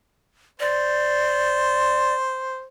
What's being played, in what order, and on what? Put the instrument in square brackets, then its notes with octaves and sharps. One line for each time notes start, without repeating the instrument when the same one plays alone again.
[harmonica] C5 [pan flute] D5